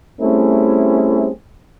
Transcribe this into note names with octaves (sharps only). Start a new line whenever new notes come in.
G3 A3 C4 C#4 E4 G#4